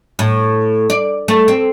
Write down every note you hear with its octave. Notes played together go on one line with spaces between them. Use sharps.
A2
D5
A3
C4